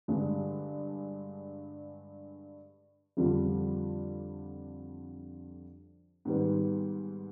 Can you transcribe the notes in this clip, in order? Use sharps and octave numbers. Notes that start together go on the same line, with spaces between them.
G2 D3 G#3 D4
F2 D3 G3 D4 F4
G#2 D#3 G3 B3